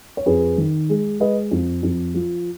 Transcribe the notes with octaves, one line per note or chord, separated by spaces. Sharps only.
C#5
F2 G#4 B4
D#3
G#3
G#3 B4 D#5
F2
F2
F3